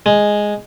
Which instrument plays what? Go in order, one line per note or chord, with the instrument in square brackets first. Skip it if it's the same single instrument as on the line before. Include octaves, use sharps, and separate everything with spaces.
[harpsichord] G#3